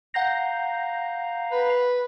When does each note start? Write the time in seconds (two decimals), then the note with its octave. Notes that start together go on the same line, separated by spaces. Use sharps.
0.14 F5 F#5 A#5 G6 A#6
1.52 B4